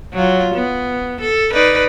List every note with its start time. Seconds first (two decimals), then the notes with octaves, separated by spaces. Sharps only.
0.13 F#3 F4
0.55 B3
1.21 A4
1.52 D#4 B4 D5